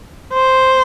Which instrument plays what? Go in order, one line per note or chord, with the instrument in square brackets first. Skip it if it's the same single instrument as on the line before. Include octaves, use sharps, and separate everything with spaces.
[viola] C5